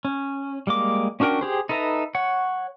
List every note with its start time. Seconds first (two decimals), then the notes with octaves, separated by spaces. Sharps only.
0.05 C#4
0.67 G3 G#3 A#3 D6
1.20 C#4 D4 F#4 A#4 G5
1.41 G4 G#4 C5
1.69 D#4 A4 B4 E5 A#5
2.15 C#5 F#5